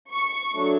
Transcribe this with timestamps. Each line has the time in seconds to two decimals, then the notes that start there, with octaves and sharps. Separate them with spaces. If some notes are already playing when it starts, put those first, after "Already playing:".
0.10 C#6
0.54 F#3 A3 D4